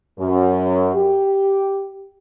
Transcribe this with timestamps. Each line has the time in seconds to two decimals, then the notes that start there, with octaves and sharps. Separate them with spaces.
0.19 F#2
0.95 G4